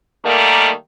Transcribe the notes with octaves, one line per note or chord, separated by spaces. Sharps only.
D#3 G3 A3 A#3